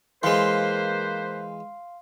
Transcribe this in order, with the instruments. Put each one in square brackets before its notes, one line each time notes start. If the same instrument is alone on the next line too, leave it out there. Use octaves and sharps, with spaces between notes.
[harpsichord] E3 G#3 [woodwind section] A#3 B4 C5 [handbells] F5 C6